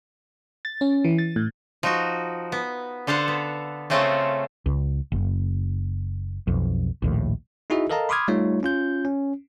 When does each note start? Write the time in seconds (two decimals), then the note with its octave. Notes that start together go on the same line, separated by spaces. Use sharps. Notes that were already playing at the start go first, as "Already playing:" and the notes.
0.65 A6
0.81 C#4
1.04 E3
1.18 A6
1.36 A2
1.83 F3 D#4 F#4
2.52 B3
3.07 D3 A4 C5 F5 F#5
3.28 B3
3.90 C#3 A3 C4 C#4 F4 A4
4.66 C#2
5.12 F#1
6.47 B1 F2
7.02 A#1 D#2 A2
7.70 D#4 E4 F#4 G#4 D#5 E5
7.90 A4 A#4 D#5 F5 A5 A#5
8.09 B5 C6 D6 D#6 F6 G#6
8.28 G3 A3 D#4 F4 C#5
8.63 C#4 F4 G6
9.05 C#4